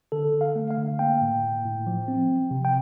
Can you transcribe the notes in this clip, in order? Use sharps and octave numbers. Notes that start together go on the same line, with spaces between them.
D3 A4
D3
F5
A3
F5
D3
A#3 G5
A2
A2
A2
F3
C4
F3
C3
G5